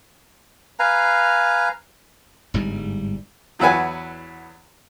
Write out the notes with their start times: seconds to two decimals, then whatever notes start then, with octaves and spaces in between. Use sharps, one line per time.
0.79 B4 F5 G#5 A#5
2.54 G1 G#2 G3
3.59 E2 F#3 E4 F#4 B4 G#5